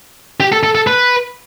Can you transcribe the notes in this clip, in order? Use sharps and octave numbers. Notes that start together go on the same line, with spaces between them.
G4
A4
A4
A4
B4